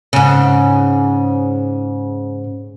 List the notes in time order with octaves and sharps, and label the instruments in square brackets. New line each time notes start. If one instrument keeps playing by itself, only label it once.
[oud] G#2 C#3